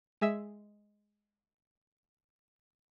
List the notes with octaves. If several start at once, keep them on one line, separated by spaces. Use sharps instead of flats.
G#3 G#4 E5 E6